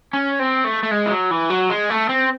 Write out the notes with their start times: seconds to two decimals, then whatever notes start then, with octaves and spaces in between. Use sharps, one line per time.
0.13 C#4
0.40 C4
0.65 A3
0.83 A3
0.91 G#3
1.06 E3
1.11 F#3
1.31 E3
1.50 F#3
1.70 G#3
1.90 A3
2.09 C4